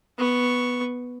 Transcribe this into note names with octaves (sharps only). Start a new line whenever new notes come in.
B3 C#6